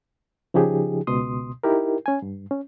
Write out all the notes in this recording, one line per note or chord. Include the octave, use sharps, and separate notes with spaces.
C#3 F3 D#4 G4 G#4
C#2 B2 C6 D#6
D#4 E4 G4 A#4
C#4 G#5
G2
C#4